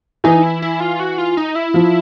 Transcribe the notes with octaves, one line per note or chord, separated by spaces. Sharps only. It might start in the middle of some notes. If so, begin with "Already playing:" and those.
E3 D#4
E4
E4
F4
F#4
F4
D#4
E4
F3